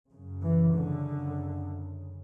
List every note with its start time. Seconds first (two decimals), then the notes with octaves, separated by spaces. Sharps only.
0.10 F#2 C#3
0.42 E3
0.73 D3